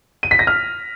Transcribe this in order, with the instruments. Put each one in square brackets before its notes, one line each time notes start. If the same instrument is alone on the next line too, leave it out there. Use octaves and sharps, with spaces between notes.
[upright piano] D#7
B6
A#6
F6